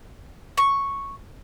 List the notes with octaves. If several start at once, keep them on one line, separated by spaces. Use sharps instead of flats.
C#6